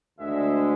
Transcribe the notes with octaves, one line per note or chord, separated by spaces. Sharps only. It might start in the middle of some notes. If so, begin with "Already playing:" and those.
D2 D3 G#3 E5